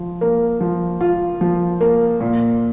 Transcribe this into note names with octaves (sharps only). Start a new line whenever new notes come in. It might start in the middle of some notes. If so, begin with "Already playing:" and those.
Already playing: F3
A#3
F3
F4
F3
A#3
A#2